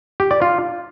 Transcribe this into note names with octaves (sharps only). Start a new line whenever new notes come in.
G4
D5
F4